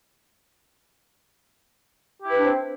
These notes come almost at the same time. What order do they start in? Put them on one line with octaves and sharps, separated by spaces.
G4 E4 B4 D4 C4